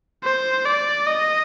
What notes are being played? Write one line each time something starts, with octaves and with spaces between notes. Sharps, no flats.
C5
D5
D#5